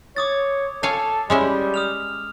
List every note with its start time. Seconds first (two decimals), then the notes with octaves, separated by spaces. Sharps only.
0.16 C#5 D6 D#6 A6
0.83 A4 C#5 F5 G#5
1.30 G3 G#3 C#4 E4
1.74 D#6 F6 F7